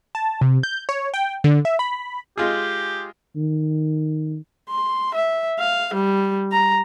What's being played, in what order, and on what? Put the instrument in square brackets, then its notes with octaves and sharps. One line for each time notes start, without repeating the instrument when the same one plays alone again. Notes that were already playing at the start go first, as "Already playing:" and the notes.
[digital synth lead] A5
C3
G6
C#5
G5
D3
E5
B5
[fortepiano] G#3 F4 G#4 [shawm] G4
[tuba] D#3
[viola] C6
E5
F5
G3
A#5